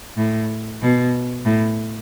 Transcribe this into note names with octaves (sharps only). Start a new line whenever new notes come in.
A2
B2
A2